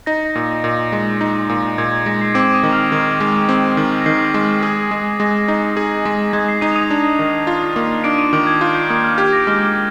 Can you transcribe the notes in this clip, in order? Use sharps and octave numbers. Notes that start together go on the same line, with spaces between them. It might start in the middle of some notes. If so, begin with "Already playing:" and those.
D#4 A#6
A#2
A#2
G#3
D#4
A#2
A#2 G#6
G#6
G#3 A#6
C7
C4 D6 D7
D#6 D#7
D#3
F6 F7
D#3
G#3
C4
D#3
A#6
D#3 C7
G#3
G#4
G#3
G#3 A#6
D#4
G#4
G#3
G#3 G#6
C7
D#4 D#6 D#7
F7
D#6 D#7
D4
D#3
F4
A#3
D4 D6 D7
D#6 D#7
D#3 D6 D7
G#6
F4 G6
G6
A#3 D#6
F6
G4 G#6
A#6
G#3 F6
F6